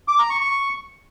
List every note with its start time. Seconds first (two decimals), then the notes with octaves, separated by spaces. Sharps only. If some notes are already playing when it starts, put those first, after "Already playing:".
0.08 D6
0.19 A#5
0.30 C#6
0.41 C#6